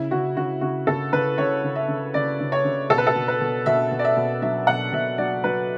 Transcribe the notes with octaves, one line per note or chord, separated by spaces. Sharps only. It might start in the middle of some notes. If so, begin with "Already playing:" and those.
Already playing: C#3 E4
C#3 F#4
C#3 F#4
C#3 F#4
C#3 A4
C#3 B4
C#3 C#5
C#3
E5
C#3
C#3 D5
C#3
C#5
C#3
B2 A4
B4
A4
B2
B4
B2
B2 E5
B2
D5
E5
B2
F#3 E5
B2 F#5
B2 E5
F#3 D5
F#3 B4